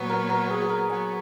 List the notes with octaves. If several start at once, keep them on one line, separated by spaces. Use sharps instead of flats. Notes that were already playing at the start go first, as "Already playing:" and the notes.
Already playing: A#2 F#3 B3
A#4
A#4
G#4
G#4
A#4
F#3 B3 G#5